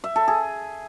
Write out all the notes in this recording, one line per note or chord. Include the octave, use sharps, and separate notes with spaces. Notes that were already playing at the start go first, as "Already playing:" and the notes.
E5
A4
G#4